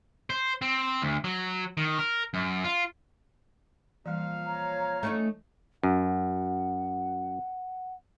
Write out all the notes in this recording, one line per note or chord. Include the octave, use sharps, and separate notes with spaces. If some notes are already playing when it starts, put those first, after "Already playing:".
C5
C4
D2
F#3
D#3
A#4
F#2
F4
A#2 E3 F3 G3 F5
C#5 A#5
A3 C#4 D#4
F#2 F#5